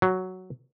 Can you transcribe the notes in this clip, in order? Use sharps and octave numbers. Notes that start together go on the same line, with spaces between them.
F#3